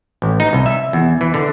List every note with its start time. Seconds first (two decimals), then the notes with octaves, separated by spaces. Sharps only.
0.22 A1
0.40 D#4
0.53 C2
0.66 E5
0.93 E2
1.21 E3
1.34 D3